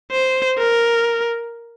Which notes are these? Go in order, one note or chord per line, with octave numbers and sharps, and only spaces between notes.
C5
A#4